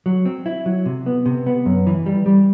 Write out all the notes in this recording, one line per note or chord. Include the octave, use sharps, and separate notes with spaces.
F#3
C4
E4
F#3
C3
B3
C3
B3
F#2
E3
G3
G3